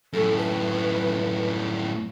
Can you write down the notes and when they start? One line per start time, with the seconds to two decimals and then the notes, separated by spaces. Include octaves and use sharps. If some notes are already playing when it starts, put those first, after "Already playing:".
0.13 F#2 A2 A4
0.38 B4